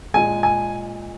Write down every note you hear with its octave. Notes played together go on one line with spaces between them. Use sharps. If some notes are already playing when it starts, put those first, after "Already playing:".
A#2 G#3 G#5
G#5